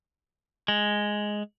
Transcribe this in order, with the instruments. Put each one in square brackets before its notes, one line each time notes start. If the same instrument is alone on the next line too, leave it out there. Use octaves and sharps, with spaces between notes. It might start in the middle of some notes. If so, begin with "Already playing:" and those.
[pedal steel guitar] G#3